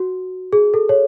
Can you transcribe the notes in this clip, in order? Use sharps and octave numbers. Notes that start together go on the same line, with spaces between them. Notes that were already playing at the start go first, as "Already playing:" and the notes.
Already playing: F#4
G#4
A4
C#5